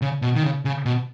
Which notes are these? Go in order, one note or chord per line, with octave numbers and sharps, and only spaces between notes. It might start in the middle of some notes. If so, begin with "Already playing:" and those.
C#3
B2
D#3
C#3
C#3
B2